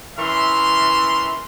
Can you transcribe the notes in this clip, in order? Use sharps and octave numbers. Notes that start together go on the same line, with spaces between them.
E3 C#4 A#4 E5 C6